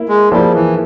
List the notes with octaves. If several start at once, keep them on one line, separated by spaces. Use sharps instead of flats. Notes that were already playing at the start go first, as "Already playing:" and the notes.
Already playing: A#3 E4
G#3
F3 G3 A#3 E4 G#4 C5
E3